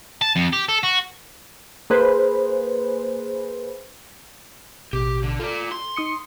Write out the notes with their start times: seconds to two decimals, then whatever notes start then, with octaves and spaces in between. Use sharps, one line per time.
0.21 A5
0.36 F2
0.53 G4
0.69 A4
0.83 F#4
1.90 A#3 G#4 B4 C5
4.93 A1 B2 G4
5.23 D3
5.40 F4 A4 D5
5.72 C6
5.96 D#4 D#6 C#7